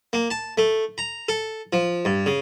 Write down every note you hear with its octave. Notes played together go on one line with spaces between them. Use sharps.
A#3
A5
A3
A#5
A4
F3
G2
C#3